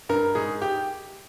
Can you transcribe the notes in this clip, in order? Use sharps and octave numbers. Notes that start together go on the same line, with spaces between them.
G2 A#4
G#2 G#4
G4